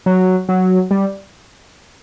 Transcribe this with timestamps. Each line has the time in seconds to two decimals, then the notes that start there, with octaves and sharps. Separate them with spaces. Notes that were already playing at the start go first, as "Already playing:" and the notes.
0.06 F#3
0.49 F#3
0.91 G3